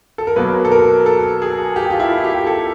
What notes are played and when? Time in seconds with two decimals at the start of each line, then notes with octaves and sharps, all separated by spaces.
0.18 A4
0.27 A#4
0.36 B2 F#3 A#3 B4
0.65 A4
0.71 A#4
1.06 A4
1.42 G#4
1.76 G4
1.90 F4
2.00 E4
2.24 G4
2.47 A4